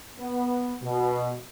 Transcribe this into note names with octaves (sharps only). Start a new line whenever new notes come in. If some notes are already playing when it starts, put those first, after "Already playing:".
B3
B2